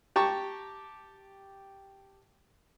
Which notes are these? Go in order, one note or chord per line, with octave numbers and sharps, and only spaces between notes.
G4 G5 A5 A#5 C#6